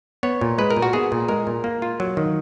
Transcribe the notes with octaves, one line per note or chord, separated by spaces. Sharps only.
B3 C#5
A#2
G#3 B4
A#4
A#2
F#4
B3 G#4
A#2
G#3 A#4
A#2
A#3
F4
F#3
D#3